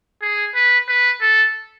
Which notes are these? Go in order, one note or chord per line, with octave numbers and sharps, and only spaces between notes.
G#4
B4
B4
A4